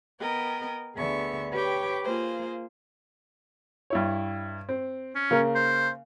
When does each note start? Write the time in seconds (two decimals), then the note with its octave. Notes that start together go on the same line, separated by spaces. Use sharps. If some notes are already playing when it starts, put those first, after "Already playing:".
0.20 B3 A#4 D#5 G5
0.96 D2 D3 B3 G#4 E5 C#6
1.52 G4 B4 C#5 G5 D6
2.03 A#3 F4 G#4 C5
3.90 G2 E4 C#5
4.69 C4
5.15 C#4
5.31 C#3 A#3 A#4
5.55 C5